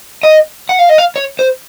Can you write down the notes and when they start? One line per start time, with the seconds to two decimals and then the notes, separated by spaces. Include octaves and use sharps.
0.23 D#5
0.69 F#5
0.79 F5
0.89 D#5
0.98 F5
1.16 C#5
1.39 C5